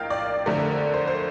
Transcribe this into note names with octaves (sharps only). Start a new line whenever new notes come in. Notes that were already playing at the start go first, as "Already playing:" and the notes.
Already playing: A#1 A2 A#4 D#5 F5 G5
D5
F2 D3 A3 A#4
C5
C5